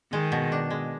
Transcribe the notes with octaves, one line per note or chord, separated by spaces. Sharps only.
D#3 G#3
B2
D4
G#3